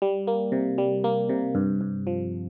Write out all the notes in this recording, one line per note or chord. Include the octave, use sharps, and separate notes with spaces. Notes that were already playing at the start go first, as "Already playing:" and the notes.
G3
A#3
C3
G3
A#3
C3
G2
G2
F3